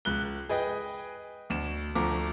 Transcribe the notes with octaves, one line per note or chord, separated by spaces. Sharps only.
C#2 F#6 G7
G#4 B4 D#5 G5
D2 E7
D2 F3 A3 A#5 D6